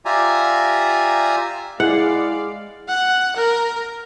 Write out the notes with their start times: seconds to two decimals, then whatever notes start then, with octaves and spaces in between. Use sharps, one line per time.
0.06 F4 G4 D5 E5 G#5 A#5
1.80 G#3 E4 G#4 D5 F5 F#5
2.88 F#5
3.36 A#4